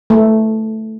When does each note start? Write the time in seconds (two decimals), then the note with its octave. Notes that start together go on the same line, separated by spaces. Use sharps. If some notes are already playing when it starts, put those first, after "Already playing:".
0.10 A3